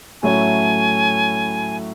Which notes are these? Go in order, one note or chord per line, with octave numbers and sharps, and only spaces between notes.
A2 F#3 A3 C#4 E4 G#5